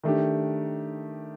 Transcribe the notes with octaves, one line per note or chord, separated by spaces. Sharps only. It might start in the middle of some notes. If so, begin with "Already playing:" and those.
D#3 A3 D4 G4